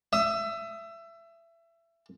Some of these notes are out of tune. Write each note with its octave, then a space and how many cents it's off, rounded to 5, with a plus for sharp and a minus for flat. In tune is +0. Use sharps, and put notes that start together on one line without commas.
E5 +25 D#6 +30